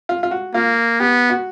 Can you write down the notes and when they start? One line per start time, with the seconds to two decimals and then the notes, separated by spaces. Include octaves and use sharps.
0.09 F4
0.23 F4
0.31 F#4
0.54 A#3 F4
1.00 B3 G4
1.30 F#4